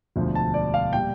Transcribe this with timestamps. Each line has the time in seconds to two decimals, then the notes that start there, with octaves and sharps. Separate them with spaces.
0.16 E1 D2 D3 F3
0.35 A5
0.54 D5
0.74 F5
0.93 A#2 G3 G5